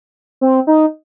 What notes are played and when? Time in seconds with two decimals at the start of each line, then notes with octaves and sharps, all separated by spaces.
0.41 C4
0.67 D#4